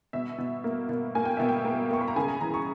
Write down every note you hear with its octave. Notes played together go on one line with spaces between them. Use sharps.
B2 E5
B2
A#3
B2
A#3 G#5
G5
B2 E5
G5
A#3
A#3 C#6
B5
A#5
C#3 G#5
A#5
E3 A#5
C#6